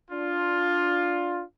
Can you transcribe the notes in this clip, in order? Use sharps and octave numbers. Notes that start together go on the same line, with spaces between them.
D4 F4